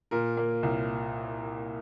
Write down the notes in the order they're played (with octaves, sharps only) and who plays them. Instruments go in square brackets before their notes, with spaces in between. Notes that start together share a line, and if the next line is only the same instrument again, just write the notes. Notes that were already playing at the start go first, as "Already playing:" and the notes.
[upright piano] A#2 A#4
A#3
C2